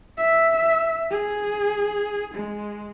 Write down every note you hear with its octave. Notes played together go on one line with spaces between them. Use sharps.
E5
G#4
G#3